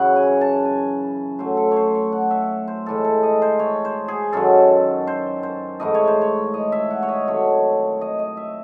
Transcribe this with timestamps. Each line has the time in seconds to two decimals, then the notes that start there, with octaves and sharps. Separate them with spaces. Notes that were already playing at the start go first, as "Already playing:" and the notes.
Already playing: F#2 C#3 E3 F#5
0.16 G#5
0.41 A5
0.65 G#5
1.39 A2 F#3 A3 C5
1.57 A4
1.71 C5 C#5
1.95 C#5
2.12 F#5
2.31 E5
2.68 C5
2.86 A2 E3 G#3 A4
3.04 A4
3.23 D#5
3.42 C5
3.59 C#5
3.85 C5
4.08 G#4
4.33 F#2 D#3 F#3 A4
5.07 C5
5.43 C5
5.80 G#2 E3 A3 D#5
5.94 C#5
6.07 C5
6.21 C#5
6.54 D#5
6.72 E5
6.91 F#5
7.03 C#5
7.08 D#5
7.27 C3 D#3 F#3 A3 C#5
8.01 D#5
8.19 D#5
8.37 E5